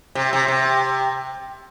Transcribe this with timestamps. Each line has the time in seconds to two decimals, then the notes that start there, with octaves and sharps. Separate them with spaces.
0.15 C3
0.33 C3
0.48 C3